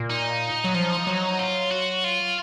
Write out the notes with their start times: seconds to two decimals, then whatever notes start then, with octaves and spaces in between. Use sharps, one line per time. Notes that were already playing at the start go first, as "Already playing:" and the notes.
Already playing: A#2
0.10 D#4
0.64 F#3
0.74 F3
1.07 F#3
1.39 F4
1.71 F#4
2.04 F4